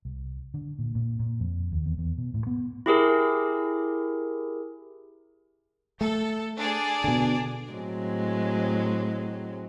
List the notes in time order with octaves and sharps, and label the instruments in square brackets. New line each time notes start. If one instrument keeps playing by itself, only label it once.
[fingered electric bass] C2
D3
A#2
A#2
A#2
F2
D#2
E2
E2
B2
A2
B3
[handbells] E4 G4 G#4 A#4
[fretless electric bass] A3 [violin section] A4
[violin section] D4 G#4 D5
[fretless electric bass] B2 D3
[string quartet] A2 F#3 G#3 C4